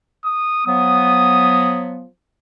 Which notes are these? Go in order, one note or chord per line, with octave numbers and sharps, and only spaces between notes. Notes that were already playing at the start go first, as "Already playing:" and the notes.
D#6
F3 F#3 B3 D#6